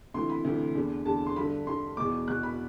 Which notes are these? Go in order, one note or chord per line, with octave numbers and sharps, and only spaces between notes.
D2 C3 E3 C6
B5
D2 C3 E3
E2 D3
E2 D3 A5
C6
G2 D3 B5
G2 D3 C6
E2 B2 D6
E2 B2 F#6
B5